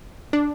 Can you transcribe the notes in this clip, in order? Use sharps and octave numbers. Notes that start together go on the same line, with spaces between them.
D4